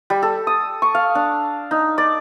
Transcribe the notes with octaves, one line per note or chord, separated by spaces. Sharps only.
G3
A4
D#6
C#6
F5
D4
D#4
D5